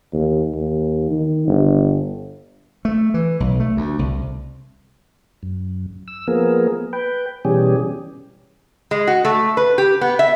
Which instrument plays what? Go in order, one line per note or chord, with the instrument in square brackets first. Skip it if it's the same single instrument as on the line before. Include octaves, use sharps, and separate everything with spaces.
[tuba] D#2
D#2
D#3
G1
[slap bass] A3
E3
B1
A3
D2
C2
[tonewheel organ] F#2
E6
F3 A#3 B3 G#4 A#4
B4 G5
B2 E3 G3 C#4 G4 G#4
[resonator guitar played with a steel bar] G#3
F#4
A3
B4
G4
B3
E5